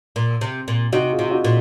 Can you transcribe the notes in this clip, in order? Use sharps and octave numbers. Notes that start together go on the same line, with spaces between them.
A#2
C3
A#2
C3 D#4 F#4
F4 G#4
C3
F4
D#4 F#4
A#2